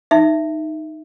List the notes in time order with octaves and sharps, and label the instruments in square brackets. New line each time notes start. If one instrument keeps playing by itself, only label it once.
[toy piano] D#4 E5